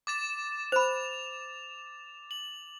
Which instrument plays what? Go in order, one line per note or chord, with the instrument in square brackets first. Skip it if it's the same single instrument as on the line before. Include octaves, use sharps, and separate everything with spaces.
[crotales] D6 A6 E7
[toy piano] C5 B5 [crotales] F7
[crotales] F#7